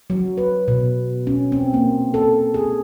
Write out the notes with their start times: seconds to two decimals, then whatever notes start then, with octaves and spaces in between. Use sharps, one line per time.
0.10 F#3
0.37 B4
0.68 B2
1.27 C#4
1.52 C4
1.74 A#3
2.14 A4
2.54 G#4